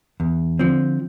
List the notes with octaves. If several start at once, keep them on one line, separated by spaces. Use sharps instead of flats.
E2
D3 F3 C4